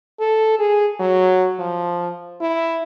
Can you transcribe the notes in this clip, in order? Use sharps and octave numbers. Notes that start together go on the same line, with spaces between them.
A4
G#4
F#3
F3
E4